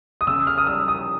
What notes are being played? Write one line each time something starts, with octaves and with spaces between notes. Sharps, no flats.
D#6
C#3 E6
F6
D#6
G3 E6
D#6